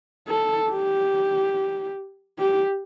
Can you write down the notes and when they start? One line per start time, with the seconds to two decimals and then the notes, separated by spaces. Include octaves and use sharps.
0.28 A4
0.70 G4
2.39 G4